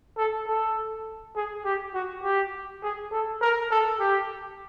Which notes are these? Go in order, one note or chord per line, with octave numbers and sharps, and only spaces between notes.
A4
A4
G#4
G4
F#4
G4
G#4
A4
A#4
A4
G4